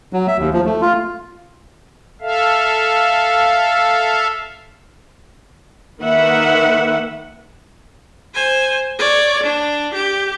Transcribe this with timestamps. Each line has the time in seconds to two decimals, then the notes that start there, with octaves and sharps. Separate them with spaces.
0.13 F#3
0.28 E5
0.39 D#2
0.53 F3
0.66 A3
0.82 F4
2.21 A4 E5 F5
6.02 D#3 A#3 B4 E5 F#5
8.34 C5 G#5
8.98 C#5 D5
9.43 D4
9.94 G4